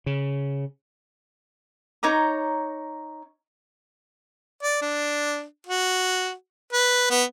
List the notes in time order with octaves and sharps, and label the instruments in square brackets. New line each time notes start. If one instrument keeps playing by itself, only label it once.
[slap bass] C#3
[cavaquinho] D#4 C#5 A#5 D6
[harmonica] D5
D4
F#4
B4
B3